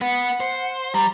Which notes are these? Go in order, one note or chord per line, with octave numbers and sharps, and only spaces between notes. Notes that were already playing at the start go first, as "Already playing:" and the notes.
B3 B4 F#5
C5
G3 A#5